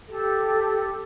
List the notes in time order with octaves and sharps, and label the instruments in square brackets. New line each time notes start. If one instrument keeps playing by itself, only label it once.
[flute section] G4 A4